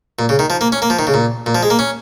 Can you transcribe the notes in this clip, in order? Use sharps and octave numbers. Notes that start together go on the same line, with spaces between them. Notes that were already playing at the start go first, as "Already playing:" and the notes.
A#2
C#3
D#3
F3
A#3
C#4
A#3
F3
D#3
C#3
A#2
A#2
F3
G#3
A#3
C#4